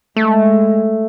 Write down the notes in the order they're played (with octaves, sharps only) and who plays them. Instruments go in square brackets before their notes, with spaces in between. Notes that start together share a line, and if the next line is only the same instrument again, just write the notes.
[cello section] G#3 [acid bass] A3